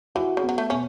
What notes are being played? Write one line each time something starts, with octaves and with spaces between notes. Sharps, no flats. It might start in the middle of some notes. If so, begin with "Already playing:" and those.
E3 F#4
C#3
B3
F#3
A3
B2 C#4